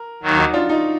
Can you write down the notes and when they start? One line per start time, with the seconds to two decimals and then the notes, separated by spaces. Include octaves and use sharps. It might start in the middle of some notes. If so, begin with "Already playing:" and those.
Already playing: A#4
0.23 D#2 D#3 F#3
0.38 D#4 F#4
0.53 D4 F4
0.69 D#4